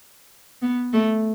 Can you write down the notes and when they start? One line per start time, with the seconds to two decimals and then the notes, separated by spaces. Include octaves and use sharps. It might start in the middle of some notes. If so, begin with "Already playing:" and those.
0.62 B3
0.93 A3